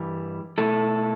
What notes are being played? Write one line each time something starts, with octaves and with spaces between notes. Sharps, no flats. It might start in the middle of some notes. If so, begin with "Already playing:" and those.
Already playing: G2 E3 G3
B2 A3 E4 A4